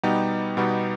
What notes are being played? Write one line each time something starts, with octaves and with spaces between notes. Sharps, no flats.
B2 G3 B3 D#4 G4
B2 G3 B3 D#4 G4